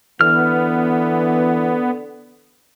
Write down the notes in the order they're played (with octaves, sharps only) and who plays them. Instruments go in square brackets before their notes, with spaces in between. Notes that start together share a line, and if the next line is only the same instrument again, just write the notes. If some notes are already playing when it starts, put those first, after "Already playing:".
[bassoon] D3 [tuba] E3 [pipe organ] B3 [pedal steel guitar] F6